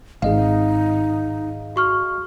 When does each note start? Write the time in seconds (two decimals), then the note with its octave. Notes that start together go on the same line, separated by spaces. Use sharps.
0.22 G#1 D#4 G#4 D#5 F5
1.76 F#4 C#6 F6